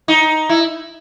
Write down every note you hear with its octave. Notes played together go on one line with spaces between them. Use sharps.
D#4
E4